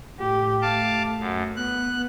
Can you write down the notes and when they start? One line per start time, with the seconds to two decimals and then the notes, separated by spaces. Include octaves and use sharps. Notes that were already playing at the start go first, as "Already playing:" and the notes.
0.20 A2 G4
0.62 A3 F5 A5 D6
1.19 F#2
1.56 B3 F#6